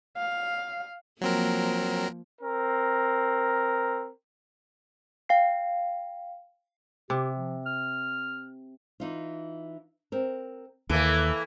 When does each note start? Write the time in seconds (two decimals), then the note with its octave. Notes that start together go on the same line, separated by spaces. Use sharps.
0.18 F5
1.21 F3 F#3 A#3 C4 A#4
2.41 C4 A#4
5.29 F5 G5 C7
7.10 C3 G4
7.37 F3
7.66 F6
9.00 E3 D#4 F4
10.12 C4 A#4
10.89 D#2 E3 A#3 A4 E5